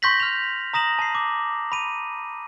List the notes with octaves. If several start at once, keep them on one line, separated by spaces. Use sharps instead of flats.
C6 C#6 G6 A#6 B6 F#7
F6 F7
A#5 D#6 A#6 E7 F#7
A5 C7
D6
B5 D#7